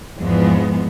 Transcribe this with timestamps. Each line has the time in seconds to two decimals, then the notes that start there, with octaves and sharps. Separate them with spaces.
0.18 E2 G#2 F3 G#3 B3